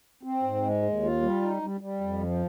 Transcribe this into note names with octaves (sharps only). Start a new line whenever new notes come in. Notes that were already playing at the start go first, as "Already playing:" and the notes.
C4
G#2
G#3
D#2
F4
G3
D#4
G3
G3
F2
F3